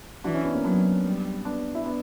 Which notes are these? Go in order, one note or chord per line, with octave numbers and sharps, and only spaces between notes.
E3 D4 F#4
C#4 E4
B3 D4
A#3 C#4
F#3 B3 D4
G3
B3 D4
E4
B3 D4